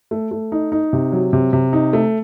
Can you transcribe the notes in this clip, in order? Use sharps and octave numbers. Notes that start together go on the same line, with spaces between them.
A3
A3
D#4
D#4
C3
F#3
C3
C3
D#4
A3